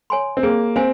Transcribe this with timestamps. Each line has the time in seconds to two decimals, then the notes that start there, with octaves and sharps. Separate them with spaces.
0.10 C#5 G#5 C6
0.37 C4
0.43 A#3 G#4
0.76 C4 C5 F5 G#5